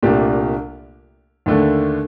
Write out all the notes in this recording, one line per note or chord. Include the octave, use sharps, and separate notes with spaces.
C2 A#2 A3 D4 G4
D#2 D3 A3 D4